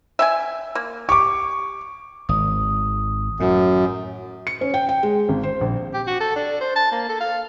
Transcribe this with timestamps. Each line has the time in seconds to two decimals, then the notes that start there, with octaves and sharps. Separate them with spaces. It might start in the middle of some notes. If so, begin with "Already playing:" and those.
0.19 E5 G5 G#5
0.75 A#3
1.09 G4 C#6 D6
2.29 G#1 D#6
3.40 F#2 A2
4.47 C#7
4.61 C#4
4.74 G5
4.89 G5
5.03 G#3
5.29 G#1
5.43 C5
5.61 A#1
5.94 G4
6.07 F#4
6.20 A4
6.36 D4
6.61 C5
6.76 A5
6.92 A#3
7.09 A4
7.21 F5